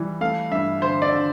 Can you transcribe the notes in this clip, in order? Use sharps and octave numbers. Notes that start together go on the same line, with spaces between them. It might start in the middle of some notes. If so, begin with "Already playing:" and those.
Already playing: E3 G3
A3 F5
G2 E5
D3 C5
D5
D3